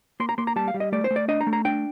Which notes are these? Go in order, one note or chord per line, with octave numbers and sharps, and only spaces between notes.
A#3 C6
A#5
A#3 C6
A#5
G3 A5
F5
G3
D#5
A3 D5
C5
A3
D5
D4 D#5
A#5
A3
A#5
D4 G5